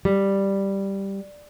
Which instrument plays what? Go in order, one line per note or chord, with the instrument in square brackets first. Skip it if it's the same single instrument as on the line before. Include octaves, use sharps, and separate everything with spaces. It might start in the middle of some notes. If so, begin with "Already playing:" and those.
[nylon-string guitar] G3